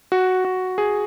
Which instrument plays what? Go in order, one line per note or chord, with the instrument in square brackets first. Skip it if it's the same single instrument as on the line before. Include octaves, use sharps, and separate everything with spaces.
[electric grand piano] F#4
F#4
G#4